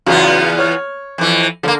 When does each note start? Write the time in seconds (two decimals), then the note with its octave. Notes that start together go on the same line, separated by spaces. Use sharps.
0.07 E2 C#3 F#3 B3 F4
0.59 C#5 F6
1.18 F2 E3
1.63 D3 F3 A#3